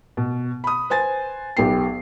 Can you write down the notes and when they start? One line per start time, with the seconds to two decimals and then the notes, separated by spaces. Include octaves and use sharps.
0.17 B2
0.64 B5 D#6
0.90 B4 C5 G#5 A6
1.57 B1 B3 G4 C7